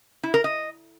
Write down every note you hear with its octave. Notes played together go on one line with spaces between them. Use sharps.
E4
A#4
D#5